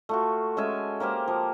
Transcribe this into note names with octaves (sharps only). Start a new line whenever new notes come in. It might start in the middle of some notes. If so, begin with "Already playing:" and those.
A3 F4 F#4
G#3 C#4 E5 G#5
A#3 G4 C5 F5
F3